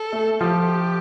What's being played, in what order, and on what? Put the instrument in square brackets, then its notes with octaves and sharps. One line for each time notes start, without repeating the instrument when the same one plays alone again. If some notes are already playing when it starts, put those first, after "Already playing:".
Already playing: [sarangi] A4
[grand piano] A3
[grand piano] F3 [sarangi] G4